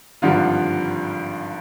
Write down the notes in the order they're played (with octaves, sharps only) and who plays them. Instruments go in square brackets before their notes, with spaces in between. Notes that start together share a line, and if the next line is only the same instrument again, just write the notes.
[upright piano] G#1 G2 D3 F3 F4